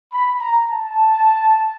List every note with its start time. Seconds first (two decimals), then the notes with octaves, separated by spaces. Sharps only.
0.13 B5
0.40 A#5
0.70 A5